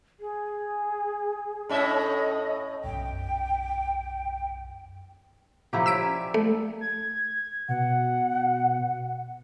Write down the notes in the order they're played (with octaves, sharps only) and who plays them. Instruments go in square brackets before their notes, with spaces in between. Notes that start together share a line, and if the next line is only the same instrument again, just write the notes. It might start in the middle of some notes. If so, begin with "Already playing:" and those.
[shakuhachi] G#4
[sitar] A2 C#4 E5 [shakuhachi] D#5
[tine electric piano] B1 F#2 [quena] G5
[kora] F3 E4 G4 [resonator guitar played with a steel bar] F#3 A3 A#3
[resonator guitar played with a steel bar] C#5 A#5 [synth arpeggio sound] E6 B6 D7
[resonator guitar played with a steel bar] G3 C#4
[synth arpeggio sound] A3
[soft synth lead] G#6
[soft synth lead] B2 [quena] F#5